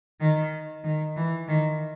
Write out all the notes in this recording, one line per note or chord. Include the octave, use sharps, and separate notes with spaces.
D#3
D#3
E3
D#3